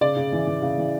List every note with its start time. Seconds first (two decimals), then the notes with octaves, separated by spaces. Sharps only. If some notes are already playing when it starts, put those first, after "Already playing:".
0.01 C#3 D5
0.16 C#3
0.32 E3
0.47 E3
0.62 C#3
0.78 E3